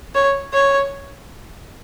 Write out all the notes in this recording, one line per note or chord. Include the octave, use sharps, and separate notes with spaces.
C#5
C#5